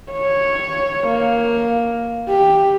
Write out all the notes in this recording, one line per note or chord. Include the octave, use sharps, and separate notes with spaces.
C#5
A#3
G4